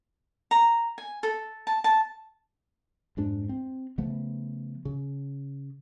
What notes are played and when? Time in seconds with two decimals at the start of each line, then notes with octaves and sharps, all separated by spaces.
0.51 A#5
0.98 G#5
1.23 A4
1.67 A5
1.84 A5
3.17 F2 G#2 D4
3.49 C4
3.98 C#3 F3 A3 B3
4.85 C#3